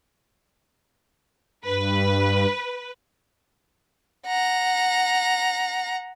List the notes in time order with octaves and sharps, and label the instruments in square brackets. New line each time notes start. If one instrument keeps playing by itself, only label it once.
[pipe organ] G2 [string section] B4
[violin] F#5 A#5